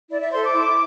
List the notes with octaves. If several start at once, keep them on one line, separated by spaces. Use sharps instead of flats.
E4 D5
E5
A4 C5 C6
D6
E4